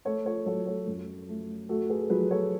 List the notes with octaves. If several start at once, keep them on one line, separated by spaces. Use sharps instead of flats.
A3 A4 C#5
A4 C#5
F#3 A4 C#5
A4 C#5
F#2
A3
A3 F#4 A4
G#4 B4
F#3 G#4 B4
A4 C#5